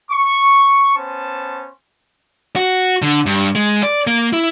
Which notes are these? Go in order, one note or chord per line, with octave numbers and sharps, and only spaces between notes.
C#6
B3 C#4 C5 A5
F#4
D3
G2
G#3
D5
A#3
E4